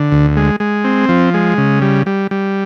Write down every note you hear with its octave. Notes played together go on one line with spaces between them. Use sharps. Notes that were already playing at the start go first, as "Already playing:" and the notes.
Already playing: D3
D2
G#3
G#3
C4
F3
G#3
C#3
G3
G3
G3